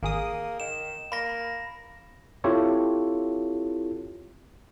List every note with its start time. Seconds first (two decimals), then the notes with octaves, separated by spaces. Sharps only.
0.03 G#1 A#3 G#4 D#6
0.60 D#3 E7
1.12 A#3 B5 A#6
2.44 C4 E4 F4 G4 A4 C#5